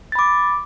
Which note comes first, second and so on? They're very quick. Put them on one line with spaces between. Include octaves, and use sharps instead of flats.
A6 B5 D6